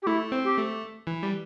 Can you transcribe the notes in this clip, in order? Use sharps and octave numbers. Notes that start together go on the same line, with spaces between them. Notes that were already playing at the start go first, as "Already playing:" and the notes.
G4
A3 E4
C4
G4
A3
E3
G3